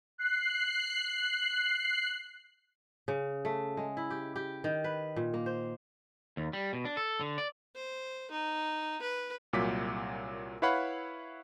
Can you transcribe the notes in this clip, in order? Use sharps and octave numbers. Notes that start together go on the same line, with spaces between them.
F#6 C7
C#3
A3
G#3
E4
G4
G4
D#3
B4
A#2
A#3
C5
D#2
G3
B2
D4
A4
D3
D5
C5
D#4
B4
C2 A#2 F#3 D6 B6
E4 B4 C#5 F5 F#5 B5